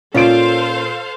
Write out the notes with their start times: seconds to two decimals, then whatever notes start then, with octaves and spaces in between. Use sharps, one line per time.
0.14 A#2 C#4 F4 A4 C5 F5 D7